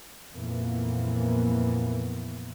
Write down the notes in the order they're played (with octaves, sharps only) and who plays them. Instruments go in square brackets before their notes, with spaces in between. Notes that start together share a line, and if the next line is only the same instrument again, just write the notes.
[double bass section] F2 A#2 E3 A#3 B3